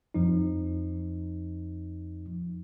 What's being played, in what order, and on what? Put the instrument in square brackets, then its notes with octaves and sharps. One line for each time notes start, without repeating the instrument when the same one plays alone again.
[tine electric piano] F2 F3 D#4